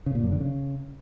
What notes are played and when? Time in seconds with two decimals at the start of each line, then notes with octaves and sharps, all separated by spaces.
0.06 C#3
0.15 A#2
0.23 F#2
0.32 D3
0.40 C#3